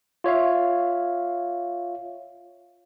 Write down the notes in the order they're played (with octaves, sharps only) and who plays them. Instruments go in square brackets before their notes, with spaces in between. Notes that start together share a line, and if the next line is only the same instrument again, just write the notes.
[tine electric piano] F4 C#5 E5 F5